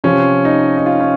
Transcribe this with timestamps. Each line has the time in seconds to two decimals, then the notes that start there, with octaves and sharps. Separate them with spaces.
0.04 C3 F3 C#4
0.45 D#4
0.77 D#4
0.86 F4
1.01 C#4